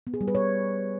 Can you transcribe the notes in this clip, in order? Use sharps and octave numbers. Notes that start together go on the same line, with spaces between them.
B3
G#4
G3
B4
C#5